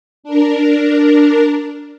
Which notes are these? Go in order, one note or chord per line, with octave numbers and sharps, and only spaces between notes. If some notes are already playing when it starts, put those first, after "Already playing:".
D4 A#4